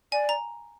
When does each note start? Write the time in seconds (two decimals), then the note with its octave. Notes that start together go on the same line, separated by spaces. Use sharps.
0.12 D5 G#5
0.29 A#5